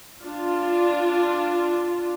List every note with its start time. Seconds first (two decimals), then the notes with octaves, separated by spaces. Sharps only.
0.24 D4 F4